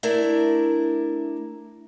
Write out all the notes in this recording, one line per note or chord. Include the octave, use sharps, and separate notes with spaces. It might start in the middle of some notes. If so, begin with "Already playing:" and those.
A3 D4 E4 A#4 D5